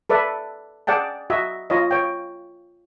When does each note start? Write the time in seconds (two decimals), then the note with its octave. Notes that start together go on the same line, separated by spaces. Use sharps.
0.10 A4 B4 D5 E5
0.87 G#4 D5 F#5 G5 A5
1.30 F#4 D#5 E5
1.70 F4 C#5 D#5
1.91 C#5 G5